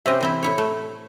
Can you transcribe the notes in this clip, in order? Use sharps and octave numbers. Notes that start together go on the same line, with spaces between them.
C3 C#4 G4 C5 D#5 E5
E3 C4 E4
A2 E4 C#5
A3